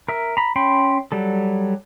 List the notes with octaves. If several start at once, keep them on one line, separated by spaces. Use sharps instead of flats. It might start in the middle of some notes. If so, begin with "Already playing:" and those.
A#4 E5
A#5 B5
C#4 G5 B5 C6
F#3 G3 A4